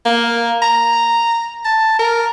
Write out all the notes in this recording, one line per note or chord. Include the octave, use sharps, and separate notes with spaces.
A#3
A#5
A5
A#4